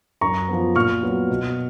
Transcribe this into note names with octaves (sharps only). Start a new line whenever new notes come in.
F#2 A#5 C#6
F3 B3
A#2 C#6 F6
F#3 B3
B2